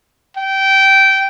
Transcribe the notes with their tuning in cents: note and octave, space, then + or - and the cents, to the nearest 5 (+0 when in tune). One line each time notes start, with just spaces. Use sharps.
G5 -15